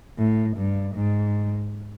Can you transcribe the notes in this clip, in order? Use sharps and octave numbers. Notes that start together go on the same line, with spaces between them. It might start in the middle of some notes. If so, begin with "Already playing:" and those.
A2
G2
G#2